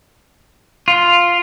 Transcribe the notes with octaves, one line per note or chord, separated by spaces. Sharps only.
F4